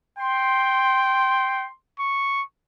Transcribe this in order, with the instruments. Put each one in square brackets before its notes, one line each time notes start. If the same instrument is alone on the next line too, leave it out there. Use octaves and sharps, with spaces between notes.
[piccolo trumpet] G5 [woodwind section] C6
[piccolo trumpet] C#6